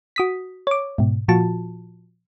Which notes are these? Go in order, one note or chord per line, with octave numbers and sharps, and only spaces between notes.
F#4 D#6 B6
C#5 D6
G#2 B2
A#2 F3 F4 F#4 A5